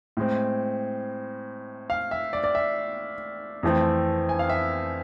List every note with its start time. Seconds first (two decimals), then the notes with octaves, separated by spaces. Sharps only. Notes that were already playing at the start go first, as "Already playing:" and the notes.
0.17 A2 G#3 C4
1.90 F5
2.11 E5
2.33 D5
2.44 D5
2.55 E5
3.63 F2 E3 A3 C4
4.29 G#5
4.39 F5
4.49 E5